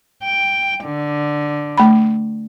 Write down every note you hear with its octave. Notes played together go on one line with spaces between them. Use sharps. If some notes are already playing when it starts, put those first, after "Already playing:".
G5
D3
A3 B5